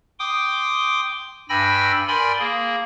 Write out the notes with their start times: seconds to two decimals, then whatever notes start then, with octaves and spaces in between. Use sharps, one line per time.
0.19 G5 C6 D6 D#6
1.49 G2 G5 G#5 B5 E6 A#6
2.08 A#4 D5 G5 G#5 B5 C6
2.39 A#3 G#4